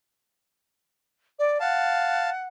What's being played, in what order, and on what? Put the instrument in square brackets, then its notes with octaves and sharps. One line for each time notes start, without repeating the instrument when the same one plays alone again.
[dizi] D5
[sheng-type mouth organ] F5 A5 [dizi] F#5